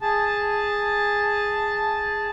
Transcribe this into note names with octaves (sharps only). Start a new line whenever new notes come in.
G#4 A5